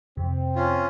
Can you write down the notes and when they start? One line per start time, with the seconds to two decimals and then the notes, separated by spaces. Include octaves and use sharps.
0.17 F2 C3 C4
0.56 C#4 F4